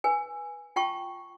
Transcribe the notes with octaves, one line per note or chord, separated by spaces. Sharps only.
B4 G#5
F4 G5 A5 C#6